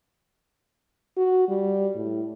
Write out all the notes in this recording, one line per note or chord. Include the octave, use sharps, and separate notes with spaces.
F#4
G3
A2